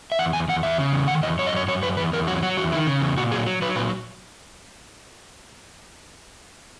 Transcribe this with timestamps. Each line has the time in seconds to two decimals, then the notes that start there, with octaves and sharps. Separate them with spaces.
0.12 E5
0.19 E2 F#5
0.33 E2 G#5
0.48 E2 F#5
0.63 E2 E5
0.79 C#3
0.93 E2
1.08 D#3 F#5
1.23 E2 D#5
1.39 F#2 C#5
1.47 D#5
1.53 F#2 C#5
1.68 F#2 C#5
1.83 F#2 B4
1.97 E2 B4
2.13 E2 A#4
2.27 F#3 F#4
2.43 F#3 F#4
2.57 E2 F#4
2.72 D#3 E4
2.87 C#3
3.01 E2
3.17 A#2 F#4
3.31 F#3 G#4
3.46 F#3
3.62 F#3 B4
3.76 A#2 B4